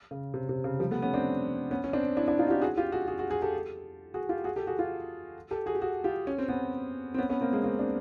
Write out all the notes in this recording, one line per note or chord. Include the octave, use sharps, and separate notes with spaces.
C#3
C3
C3
C#3
F3 G3
A3 B3
B3 C#4
C4 D4
B3 C#4
C#4
C4 D4
D4 E4
D4 E4
D#4 F4
F#4
F4 G4
F#4 G#4
F4 G4
F#4 G#4
F#4 G#4
F#4 G#4
F#4 G#4
G4 A4
F#4 G#4
F4 G4
F#4 G#4
G4 A4
F#4 G#4
F4 G4
G4 A4
F#4 G#4
G4
F#4 G#4
F4 G4
C#4
C4
B3 C#4
C4
B3 C#4
B3 C#4
A#3 C4
G#3 A#3
A#3 C4
C4 D4